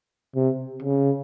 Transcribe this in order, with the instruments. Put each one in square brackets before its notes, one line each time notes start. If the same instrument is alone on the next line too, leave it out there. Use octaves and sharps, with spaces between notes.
[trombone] C3
C#3